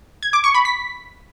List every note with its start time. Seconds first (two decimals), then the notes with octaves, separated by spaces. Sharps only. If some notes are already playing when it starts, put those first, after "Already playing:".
0.23 G#6
0.33 D6
0.44 C#6
0.54 B5
0.65 B6